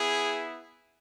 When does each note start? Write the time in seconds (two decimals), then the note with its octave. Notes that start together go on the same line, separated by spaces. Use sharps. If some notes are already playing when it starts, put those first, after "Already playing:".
Already playing: B3 E4 G#4